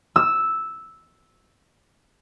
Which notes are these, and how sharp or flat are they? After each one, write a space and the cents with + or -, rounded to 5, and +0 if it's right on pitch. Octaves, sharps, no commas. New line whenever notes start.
E6 -5